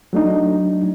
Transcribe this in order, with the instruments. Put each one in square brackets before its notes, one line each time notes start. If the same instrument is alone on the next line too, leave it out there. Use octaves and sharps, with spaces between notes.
[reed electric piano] F#3 A3 D4 D#4